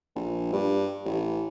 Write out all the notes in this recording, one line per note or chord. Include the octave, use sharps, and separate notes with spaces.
A#1
G2
A1